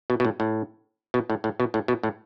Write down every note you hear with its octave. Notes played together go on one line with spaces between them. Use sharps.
B2
B2
A2
A2
B2
A2
A2
B2
A2
B2
A2